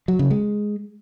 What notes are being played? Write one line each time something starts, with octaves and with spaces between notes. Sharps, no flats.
F#3
C#3
G#3